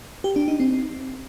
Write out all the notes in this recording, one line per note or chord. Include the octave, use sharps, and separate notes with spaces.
G4
D4
D#4
C4